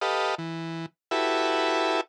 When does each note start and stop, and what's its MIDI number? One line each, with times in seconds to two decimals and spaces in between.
0.01 0.35 67
0.01 0.35 69
0.01 0.35 71
0.01 0.35 75
0.01 0.35 77
0.38 0.86 52
1.11 2.01 64
1.11 2.01 66
1.11 2.01 67
1.11 2.01 69
1.11 2.01 71
1.11 2.01 76